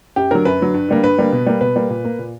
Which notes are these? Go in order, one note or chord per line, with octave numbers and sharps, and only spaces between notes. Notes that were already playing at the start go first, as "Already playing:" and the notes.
F#2 G4
D3 F#3 A#4
F#2 B4
D3 F#3
G2
D3 G3 A#3
G2 B4
D3 G3 A#3
B2
G3 A#3
B2 B4
G3 A#3
A#2
A#3
A#2